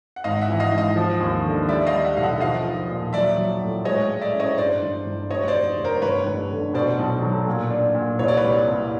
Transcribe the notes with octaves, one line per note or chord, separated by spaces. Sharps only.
F#5
G#1 D#5 F5
E5 F#5
E3
D#5 F5
G#2
D#5 F5
F3
D#2
D3
G3 D5 E5
D#5 F5
G3
E5 F#5
B1 F5
E5 F#5
F3 D#5 F5
F3
A#2
F#3 D5 E5
F#3
A2
G#3 C#5 D#5
G#3
D5 E5
C#4
C#5 D#5
G2 C5 D5
G1
G1
F1 C#5 D#5
C5 D5
F1
F1
A#4 C5
G1 B4 C#5
G1
D3
B2 C5 D5
B1
F#3
A#2
D4
A#2
C2 C#5
D5
B4 C#5
G3
C2